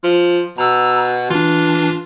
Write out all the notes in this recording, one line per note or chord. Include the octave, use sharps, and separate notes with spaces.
F3
B2 A#5 E6
E3 D4 F4